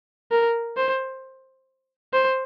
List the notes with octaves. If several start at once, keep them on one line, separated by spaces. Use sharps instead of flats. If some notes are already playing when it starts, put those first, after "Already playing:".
A#4
C5
C5